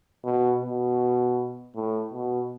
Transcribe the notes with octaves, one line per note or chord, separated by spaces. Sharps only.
B2
B2
A2
B2